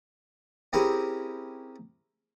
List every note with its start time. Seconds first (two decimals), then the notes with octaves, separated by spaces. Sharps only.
0.73 C4 C#4 E4 G4 G#4 A#4